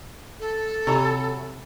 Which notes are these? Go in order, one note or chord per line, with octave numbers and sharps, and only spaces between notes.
A4
C3 E3 F#3